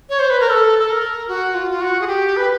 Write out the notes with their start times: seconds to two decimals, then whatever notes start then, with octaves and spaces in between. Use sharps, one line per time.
0.09 C#5
0.19 C5
0.30 B4
0.40 A#4
0.50 A4
0.79 A4
0.90 A#4
1.28 F#4
1.54 F4
1.71 F4
1.81 F#4
2.01 G#4
2.07 G4
2.37 B4